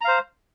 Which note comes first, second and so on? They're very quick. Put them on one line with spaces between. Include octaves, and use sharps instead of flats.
A#5 F5 C5